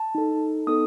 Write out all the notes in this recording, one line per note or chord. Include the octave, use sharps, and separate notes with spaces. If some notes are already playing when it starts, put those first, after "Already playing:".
Already playing: A5
D#4 A4
B3 D#4 A4 D#6